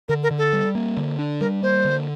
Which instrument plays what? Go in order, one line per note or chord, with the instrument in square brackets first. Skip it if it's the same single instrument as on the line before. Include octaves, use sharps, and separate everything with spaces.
[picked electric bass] D3 [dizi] A#4
[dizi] A#4
[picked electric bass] D3
[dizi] A4
[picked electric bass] G3
A#3
D3
D4
[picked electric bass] G3 [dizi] A#4
[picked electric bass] A#3 [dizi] C5
[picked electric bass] D3